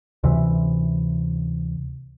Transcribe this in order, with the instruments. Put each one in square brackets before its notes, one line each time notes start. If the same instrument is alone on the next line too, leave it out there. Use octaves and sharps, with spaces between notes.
[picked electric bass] D2 C3 E3